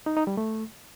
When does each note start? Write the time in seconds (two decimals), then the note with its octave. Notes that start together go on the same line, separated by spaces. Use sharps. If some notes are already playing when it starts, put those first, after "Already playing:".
0.06 D#4
0.17 D#4
0.27 G3
0.37 A3